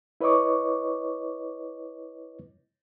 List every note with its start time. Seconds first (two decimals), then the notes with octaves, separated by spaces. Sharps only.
0.21 E4 B4 C#5 D#5 C#6 D6